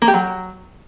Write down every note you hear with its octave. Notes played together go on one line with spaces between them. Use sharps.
A#3
G4
F#3